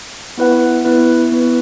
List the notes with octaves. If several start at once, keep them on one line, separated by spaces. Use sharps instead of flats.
B3 E4 B4 F#5
B3 E4 B4
B3 E4 B4